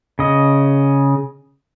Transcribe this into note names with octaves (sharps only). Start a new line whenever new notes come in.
C#3 D#5